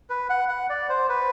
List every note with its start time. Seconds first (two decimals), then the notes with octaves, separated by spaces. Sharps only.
0.10 B4
0.30 F#5
0.49 F#5
0.70 D5
0.89 C5
1.09 B4